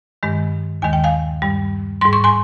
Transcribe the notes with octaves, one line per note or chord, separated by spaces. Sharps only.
G2 D#3 G#3
D#2 D#3 G#3 G#5
G5
F5 G#5
G2 G3
G#2 G3 C6
C#6
G#5 C6